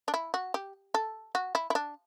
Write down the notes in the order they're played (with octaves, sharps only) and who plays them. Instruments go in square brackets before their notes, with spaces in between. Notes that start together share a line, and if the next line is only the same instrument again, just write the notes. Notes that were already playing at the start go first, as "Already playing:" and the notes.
[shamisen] D4
E4
F#4
G4
A4
F#4
E4
E4
D4